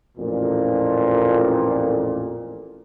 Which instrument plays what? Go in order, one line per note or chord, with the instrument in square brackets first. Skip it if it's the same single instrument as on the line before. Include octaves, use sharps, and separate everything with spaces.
[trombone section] A1 F2 A#2